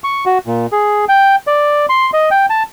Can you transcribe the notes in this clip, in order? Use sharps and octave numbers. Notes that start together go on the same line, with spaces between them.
C#6
F#4
A#2
G#4
G5
D5
C6
D#5
G5
A5